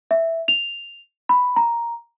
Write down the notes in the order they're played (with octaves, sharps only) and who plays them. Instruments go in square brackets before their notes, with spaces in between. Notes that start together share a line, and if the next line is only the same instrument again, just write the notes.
[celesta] E5
F7
B5
A#5